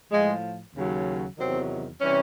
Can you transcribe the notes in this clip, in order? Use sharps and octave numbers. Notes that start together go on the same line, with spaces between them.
A2 F3 G#3
D#2 C#3 F#3
E2 C3 D#3 F#3 C4
C3 E3 G3 C#4